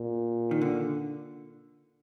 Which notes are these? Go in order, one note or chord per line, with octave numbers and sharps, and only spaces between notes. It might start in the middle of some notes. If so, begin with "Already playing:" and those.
Already playing: A#2
D#3
D3